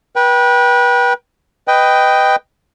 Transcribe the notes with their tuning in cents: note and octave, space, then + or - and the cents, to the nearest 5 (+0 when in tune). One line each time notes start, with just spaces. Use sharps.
B4 -30 G5 -5
B4 +10 D#5 +0 G5 +0